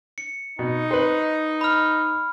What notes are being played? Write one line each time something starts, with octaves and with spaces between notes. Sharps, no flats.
C#7
B2 D#4
B4 C5
B5 F6